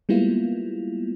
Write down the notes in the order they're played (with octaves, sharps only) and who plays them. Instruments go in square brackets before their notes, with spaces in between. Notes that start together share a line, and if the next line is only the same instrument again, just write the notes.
[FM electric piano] G3 G#3 A#3 B3 E4 F4